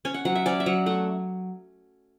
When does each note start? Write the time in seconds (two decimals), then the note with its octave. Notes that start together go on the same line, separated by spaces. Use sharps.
0.05 C#4 G#5
0.14 F#5
0.25 F#3 F#5
0.35 E5
0.46 C#4 D5
0.60 E5
0.66 F#3 F#5
0.86 A3 F#5